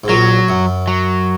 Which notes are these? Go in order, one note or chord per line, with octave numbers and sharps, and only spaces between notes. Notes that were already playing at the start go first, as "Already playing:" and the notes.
G#2
A#1 A#2 F#3
F#2
F#3